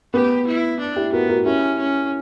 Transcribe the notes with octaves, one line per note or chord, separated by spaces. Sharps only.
B3 G4
E4
D4
E4 G4
B3 F#4 A#4
F#4 A#4
C#4 E4 G4
C#4